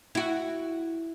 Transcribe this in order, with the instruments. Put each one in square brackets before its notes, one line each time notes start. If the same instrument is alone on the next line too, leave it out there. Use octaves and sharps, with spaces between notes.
[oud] E4 F#4